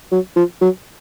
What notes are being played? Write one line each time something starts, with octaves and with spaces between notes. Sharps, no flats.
F#3
F3
F#3